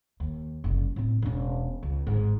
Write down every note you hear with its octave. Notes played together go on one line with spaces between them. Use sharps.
D#2
F#1 C2
A2 C4
E1 C#4
C#2
G#1 G#2